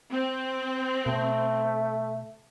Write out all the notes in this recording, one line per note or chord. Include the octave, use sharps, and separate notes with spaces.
C4
B2 A3